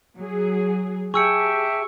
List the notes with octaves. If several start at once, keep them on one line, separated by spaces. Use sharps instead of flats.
F#3 G#4
G4 G#4 E5 G5 A5 C#6 E6 C#7